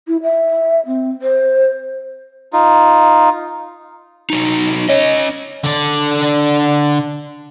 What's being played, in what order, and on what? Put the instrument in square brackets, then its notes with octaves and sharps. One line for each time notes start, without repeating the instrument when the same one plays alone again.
[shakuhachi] E4
E5
C4
C5
[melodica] D#4 F4
[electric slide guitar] F#3 D#4
[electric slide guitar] C#4 D#5 [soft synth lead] C#5
[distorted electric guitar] D3 D5